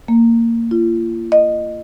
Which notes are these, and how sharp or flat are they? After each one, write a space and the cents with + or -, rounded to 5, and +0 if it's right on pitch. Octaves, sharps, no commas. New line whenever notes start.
A#3 -15
F4 -40
D#5 -15